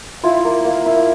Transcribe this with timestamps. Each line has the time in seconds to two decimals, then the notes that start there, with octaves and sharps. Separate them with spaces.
0.23 E4 F4
0.45 A#3
0.65 A#3
0.86 E4